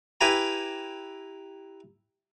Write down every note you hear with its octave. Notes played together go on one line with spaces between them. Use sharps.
E4 G4 B4 E5 G#5 A#5